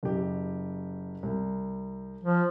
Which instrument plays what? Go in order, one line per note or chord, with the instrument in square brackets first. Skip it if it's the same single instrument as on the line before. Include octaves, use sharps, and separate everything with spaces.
[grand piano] F#1 G4
C2
[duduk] F3